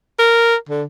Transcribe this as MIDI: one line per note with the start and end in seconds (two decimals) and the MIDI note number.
0.19 0.56 70
0.69 0.83 50